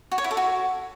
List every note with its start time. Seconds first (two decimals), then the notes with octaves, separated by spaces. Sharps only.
0.12 F#4
0.18 C#5
0.24 E4
0.31 A4
0.37 F#4